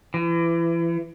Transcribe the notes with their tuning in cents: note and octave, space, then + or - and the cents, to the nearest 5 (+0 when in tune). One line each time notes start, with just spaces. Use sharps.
E3 +30